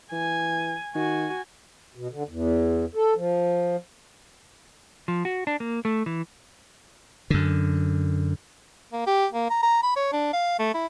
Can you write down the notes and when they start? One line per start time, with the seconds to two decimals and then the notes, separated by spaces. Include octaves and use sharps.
0.12 E3 G#5
0.95 D#3 F#4 G#5
1.95 B2
2.11 D3
2.29 E2
2.95 A4
3.15 F3
5.08 F3
5.25 F#4
5.47 D4
5.60 A#3
5.85 A3
6.06 E3
7.30 F#2 D3
8.93 A#3
9.07 G4
9.33 A#3
9.50 A#5
9.63 A#5
9.83 B5
9.97 C#5
10.13 D4
10.33 F5
10.59 A3
10.74 E4